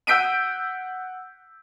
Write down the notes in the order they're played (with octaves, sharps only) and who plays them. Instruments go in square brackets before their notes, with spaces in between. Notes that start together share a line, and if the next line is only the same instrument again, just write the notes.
[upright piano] F#5 E6 G6 B6 D7 D#7